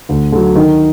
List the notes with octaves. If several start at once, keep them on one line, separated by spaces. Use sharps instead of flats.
D2
D3 F#3
D#3